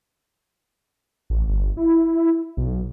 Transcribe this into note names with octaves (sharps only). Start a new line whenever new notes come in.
A1
G1
E4
B1